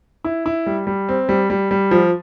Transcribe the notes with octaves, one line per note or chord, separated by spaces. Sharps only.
E4
E4
G3
G3
C4
G3
G3
G3
F3